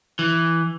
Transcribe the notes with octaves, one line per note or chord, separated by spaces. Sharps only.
E3